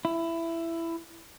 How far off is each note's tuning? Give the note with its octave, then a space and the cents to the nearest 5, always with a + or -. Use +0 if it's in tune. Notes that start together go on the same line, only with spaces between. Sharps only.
E4 +15